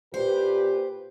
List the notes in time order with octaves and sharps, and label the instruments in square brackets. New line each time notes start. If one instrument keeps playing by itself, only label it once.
[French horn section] A#2 G4 B4 [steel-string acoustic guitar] C5